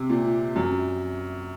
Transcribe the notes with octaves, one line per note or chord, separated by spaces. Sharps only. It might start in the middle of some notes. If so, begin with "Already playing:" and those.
Already playing: C3
A#2
F#2